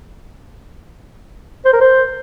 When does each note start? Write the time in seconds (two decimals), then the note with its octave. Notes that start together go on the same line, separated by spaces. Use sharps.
1.65 C5
1.73 A#4
1.81 C5